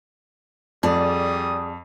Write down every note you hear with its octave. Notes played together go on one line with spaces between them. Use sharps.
F2 G3 G#4 D5 D#6